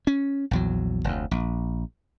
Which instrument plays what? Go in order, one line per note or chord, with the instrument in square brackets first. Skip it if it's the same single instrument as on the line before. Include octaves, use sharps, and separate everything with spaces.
[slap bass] C#4
A#1 E2 F#3
F1 D2
A#1